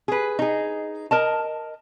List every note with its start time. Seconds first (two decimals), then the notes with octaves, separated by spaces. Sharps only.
0.08 G#4 B4
0.39 D#4 G#4
1.11 A#4 D#5 A5